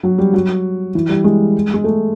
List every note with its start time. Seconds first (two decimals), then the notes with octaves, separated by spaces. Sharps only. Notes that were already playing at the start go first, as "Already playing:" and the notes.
0.03 F#3
0.18 G3
0.34 F#3
0.95 E3
1.09 G3
1.24 G#3
1.74 G#3
1.84 A3